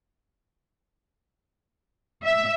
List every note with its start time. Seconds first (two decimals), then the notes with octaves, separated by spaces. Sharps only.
2.25 E5